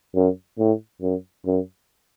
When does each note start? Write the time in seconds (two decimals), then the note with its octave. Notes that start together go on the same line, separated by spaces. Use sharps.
0.15 F#2
0.59 A2
1.02 F#2
1.46 F#2